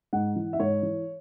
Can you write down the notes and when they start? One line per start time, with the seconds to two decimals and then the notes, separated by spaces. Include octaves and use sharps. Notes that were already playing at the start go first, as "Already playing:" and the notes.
0.13 G#2 F#5
0.36 E3
0.53 E5
0.60 G#2 C#5
0.83 E3